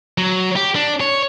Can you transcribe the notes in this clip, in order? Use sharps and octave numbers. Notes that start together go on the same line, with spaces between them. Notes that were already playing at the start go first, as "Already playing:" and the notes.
F#3
G4
D4
C#5